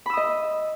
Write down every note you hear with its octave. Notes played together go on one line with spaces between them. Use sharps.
D#5 B5 D#6 E6